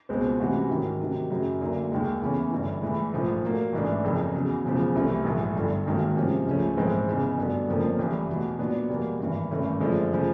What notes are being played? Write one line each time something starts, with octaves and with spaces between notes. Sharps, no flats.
C#2 B2 G#3 C4
C3 E3 G#3 C#4 F#4
G#2 D#3 F#3
C3 D#3 F#3
F#2 C#3 F#3
D2 D3 F#3 A#3 D#4
D#2 D#3 G#3
E2 C#3 E3 A3 C#4
G1 G2 E3
A2 E3 G#3
A#1 G#2 F3 A3
A#2 F#3 A#3
A1 G#2 E3 A3 D4
F#1 F2 C#3
E2 C#3 F#3
E1 E2 C#3 F3
C2 C3 E3 A3
A#1 G#2 E3 A3
G1 G2 D3
G#1 G#2 D#3 F#3 A#3
C3 F3 G#3 C#4
C#2 C#3 F3 A3 C#4
A#1 G#2 E3 G#3 C4
F1 E2 C#3
G2 D3 F#3 B3 D4
F#1 F2 D3 F3 A#3
A1 A2 E3 G3
E2 B2 F#3
A#2 F#3 B3 D4
E2 B2 G3 A#3
G#1 G2 E3
G#1 G2 E3 A3 C#4
F#2 D3 F3 G#3
C#3 F3